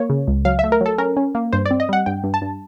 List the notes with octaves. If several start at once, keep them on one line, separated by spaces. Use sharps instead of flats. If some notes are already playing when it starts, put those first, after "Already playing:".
Already playing: A#3 C#5
C#3
C#2
F#3 F5
E5
A3
A#4
F#3 A4
C#4 A#4
C#4
A#3
G2 C5
D5
C4
D#5
G3 F#5
G2 G5
G2
A5
G2